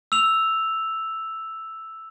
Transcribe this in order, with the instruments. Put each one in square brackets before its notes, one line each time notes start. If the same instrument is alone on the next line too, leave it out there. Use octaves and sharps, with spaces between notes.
[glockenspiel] E6 F7